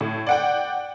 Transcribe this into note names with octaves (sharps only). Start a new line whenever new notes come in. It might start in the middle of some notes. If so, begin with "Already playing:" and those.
A2
D5 F#5 G5